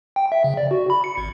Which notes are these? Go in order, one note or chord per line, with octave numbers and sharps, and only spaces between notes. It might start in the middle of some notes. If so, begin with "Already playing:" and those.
G5
E5
C#3
D5
F#4
B5
C#7
G#1